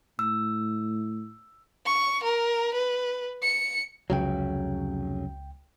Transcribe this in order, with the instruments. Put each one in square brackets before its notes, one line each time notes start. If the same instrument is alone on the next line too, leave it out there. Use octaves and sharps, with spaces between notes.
[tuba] A2 [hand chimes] E6
[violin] C#6
A#4
B4
C#7
[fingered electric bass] F1 C#3 F#3 [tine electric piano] C#2 G5